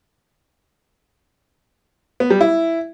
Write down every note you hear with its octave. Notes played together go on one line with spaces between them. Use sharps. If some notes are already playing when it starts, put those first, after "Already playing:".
B3
G3
E4